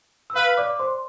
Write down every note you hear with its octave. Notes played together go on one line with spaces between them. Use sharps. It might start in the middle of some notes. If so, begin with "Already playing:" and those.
E6
B4 F5 F6
D5 D6
C5 C6